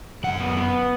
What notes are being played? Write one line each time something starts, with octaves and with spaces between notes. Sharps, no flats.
F#2 F#5
B3
B3